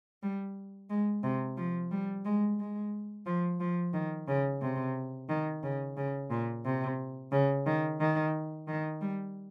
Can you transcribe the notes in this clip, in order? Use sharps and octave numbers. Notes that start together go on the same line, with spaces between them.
G3
G#3
C3
F3
G3
G#3
G#3
F3
F3
D#3
C#3
C3
D#3
C#3
C#3
A#2
C3
C#3
D#3
D#3
D#3
G3